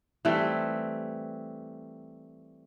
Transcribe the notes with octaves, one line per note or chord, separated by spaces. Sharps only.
E3 G3 A3 C4